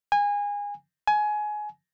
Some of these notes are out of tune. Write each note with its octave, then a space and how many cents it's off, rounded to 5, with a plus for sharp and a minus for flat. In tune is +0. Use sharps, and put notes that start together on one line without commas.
G#5 -25
G#5 +20